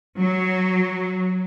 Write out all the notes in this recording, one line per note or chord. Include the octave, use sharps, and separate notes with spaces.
F#3